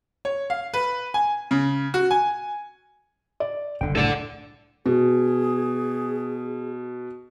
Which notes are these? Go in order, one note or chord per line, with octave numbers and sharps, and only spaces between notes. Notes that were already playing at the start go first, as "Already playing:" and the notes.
C#5
F5
B4
G#5
C#3
F#4
G#5
D5
F#1 C2 D3 G5
D2 A2 A4 D5 E7
B2 G#4